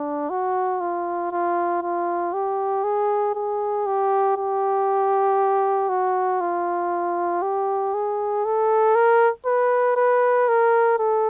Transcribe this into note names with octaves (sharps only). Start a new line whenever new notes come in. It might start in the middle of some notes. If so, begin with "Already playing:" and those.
Already playing: D4
F#4
F4
F4
F4
G4
G#4
G#4
G4
G4
F#4
F4
G4
G#4
A4
A#4
B4
B4
A#4
A4